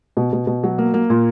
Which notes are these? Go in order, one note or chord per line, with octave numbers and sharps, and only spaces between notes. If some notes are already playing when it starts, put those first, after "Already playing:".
B2
B2
B2
F#3
A#3
A#3
A#2